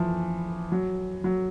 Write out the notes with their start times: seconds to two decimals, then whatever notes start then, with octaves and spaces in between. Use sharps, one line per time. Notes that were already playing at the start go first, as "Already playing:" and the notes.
Already playing: E3 F3
0.72 F#3
1.24 F#3